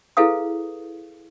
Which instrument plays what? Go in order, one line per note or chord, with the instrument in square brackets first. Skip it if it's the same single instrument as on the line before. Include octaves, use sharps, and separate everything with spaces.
[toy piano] E4 G#4 A4 B4 F5 D#6